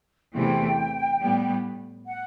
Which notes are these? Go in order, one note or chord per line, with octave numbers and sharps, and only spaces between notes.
E2 C3 E3 A3 G5
A2 G3 B3
F#5